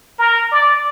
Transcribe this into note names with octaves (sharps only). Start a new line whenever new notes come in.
A#4
D5